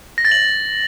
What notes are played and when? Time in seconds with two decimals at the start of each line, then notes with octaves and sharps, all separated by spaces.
0.18 A#6
0.25 A6
0.32 F#7